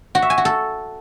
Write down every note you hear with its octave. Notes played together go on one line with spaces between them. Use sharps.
F#4
E5
G#5
F#4
A4